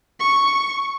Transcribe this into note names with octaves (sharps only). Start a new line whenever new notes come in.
C#6